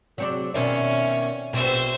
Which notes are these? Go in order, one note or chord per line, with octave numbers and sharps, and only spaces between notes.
C3 F#3 C4 D4 F#4 G#4
B2 D#3 C4 C#4 D5 E5
A#1 B2 C4 C5 E5